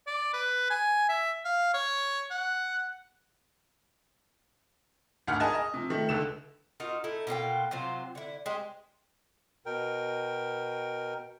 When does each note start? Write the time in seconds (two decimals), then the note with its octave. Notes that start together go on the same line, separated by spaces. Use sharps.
0.07 D5
0.34 B4
0.70 G#5
1.09 E5
1.45 F5
1.74 C#5
2.31 F#5
5.27 G#1 D2 F#5 F6
5.40 G#4 A#4 D#5 G#5 A5
5.55 D#5
5.74 C3 F3
5.90 D#3 A3
6.09 C#2 D3 E7
6.80 D#4 F4 F#4 A#4
7.04 A3 D#4 E4
7.27 B2 A#3 F4 G5
7.71 C3 F#3 F4 C5
8.15 D3 E4
8.46 G#3 G4 C5
9.66 B2 A#4 G5